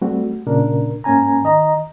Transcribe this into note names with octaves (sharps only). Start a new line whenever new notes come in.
G3 A3 C4 F#4
A#2 C#3 D4 A#4
G#2 A#3 C#4 G#5 A#5
D#3 D#5 A#5